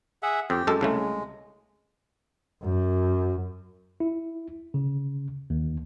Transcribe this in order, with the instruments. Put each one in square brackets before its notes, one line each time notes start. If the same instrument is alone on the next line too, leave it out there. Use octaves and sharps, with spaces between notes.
[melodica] G#4 E5 F#5
[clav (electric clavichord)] F2 [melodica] G4 G5
[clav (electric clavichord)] F#2 G#3 A4
[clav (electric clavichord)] C2 C#3 A3 [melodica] G#3
[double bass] F#2
[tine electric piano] E4
C#3
D#2